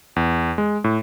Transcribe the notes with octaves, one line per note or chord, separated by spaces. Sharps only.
E2
G#3
A2